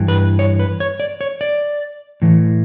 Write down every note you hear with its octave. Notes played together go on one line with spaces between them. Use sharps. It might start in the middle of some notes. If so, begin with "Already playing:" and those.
Already playing: G2 E3
B4
C#5
B4
C#5
D5
C#5
D5
A2 E3